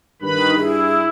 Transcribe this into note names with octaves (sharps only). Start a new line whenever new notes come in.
G2 D#3 B4 B5
E4 G#4